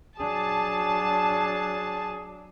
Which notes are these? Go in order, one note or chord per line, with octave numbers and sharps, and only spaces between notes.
F#3 D4 G#4 A5